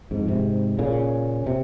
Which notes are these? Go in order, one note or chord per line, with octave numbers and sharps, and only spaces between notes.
F2 G#2
G#2 C3
A#2 C#3
C3